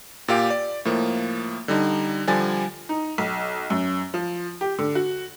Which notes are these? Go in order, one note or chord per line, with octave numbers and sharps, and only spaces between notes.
A#2 G4 F5 D7
D5
A2 F3 A#3
D3 G3 D#4
D3 F3 G3 G#5 A6
D#4
B1
F#2
F3
G4
D3
F#4